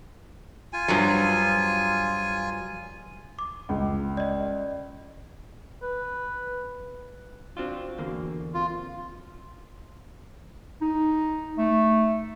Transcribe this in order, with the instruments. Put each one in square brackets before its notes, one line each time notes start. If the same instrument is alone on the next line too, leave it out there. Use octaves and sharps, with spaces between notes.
[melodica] F4 G#5
[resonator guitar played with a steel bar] G2 F3 F#3
[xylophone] D6
[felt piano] C#2
[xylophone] D5 D#5
[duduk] B4
[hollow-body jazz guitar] C4 D4 F4 [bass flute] F#4
[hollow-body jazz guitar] E2 D3 A#3
[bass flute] C4 [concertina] F4
[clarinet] D#4
A3